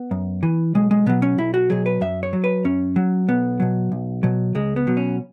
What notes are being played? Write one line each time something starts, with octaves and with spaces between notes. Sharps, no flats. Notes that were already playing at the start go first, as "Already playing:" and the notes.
Already playing: B3
F#2
E3
B1 G#3
G#3
B2 F#3 B3
C#4
B1 E4
F#4
B2 F#3 G#4
B4
F#2 E5
C#5
F#3
B4
F#2 C#4
F#3
B1 B3
B2 F#3
B1
B2 F#3
C#2 G#3
B3
B2 F#3
C#4